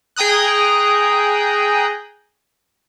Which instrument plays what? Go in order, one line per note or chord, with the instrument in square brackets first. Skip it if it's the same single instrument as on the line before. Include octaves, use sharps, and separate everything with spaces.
[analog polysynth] G#4 G5 A#5 D#6 F#6